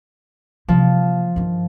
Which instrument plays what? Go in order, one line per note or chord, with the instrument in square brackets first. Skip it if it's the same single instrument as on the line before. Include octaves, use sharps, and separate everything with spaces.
[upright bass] C3 A#3 [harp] F3
[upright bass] G2 D#3